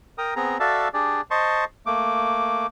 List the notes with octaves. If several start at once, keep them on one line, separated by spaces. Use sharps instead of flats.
A#4 G5 A#5 D#6
B3 C4 G#4 A#5
F#4 A4 D5 E5 F5 A5
D4 G4 G#4 D5
C5 D#5 A5 C6 C#6
A3 A#3 D6